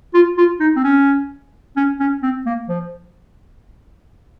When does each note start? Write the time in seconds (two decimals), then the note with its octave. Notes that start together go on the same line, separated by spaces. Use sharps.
0.14 F4
0.38 F4
0.60 D#4
0.76 C4
0.84 C#4
1.76 C#4
2.00 C#4
2.23 C4
2.46 A#3
2.69 F3